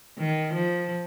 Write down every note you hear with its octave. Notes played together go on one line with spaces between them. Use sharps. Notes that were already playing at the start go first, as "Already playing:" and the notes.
D#3
F3